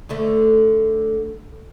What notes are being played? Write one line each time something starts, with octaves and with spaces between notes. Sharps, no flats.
D2 D3 A3